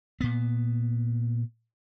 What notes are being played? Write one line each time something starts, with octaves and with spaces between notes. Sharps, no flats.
A#2 B3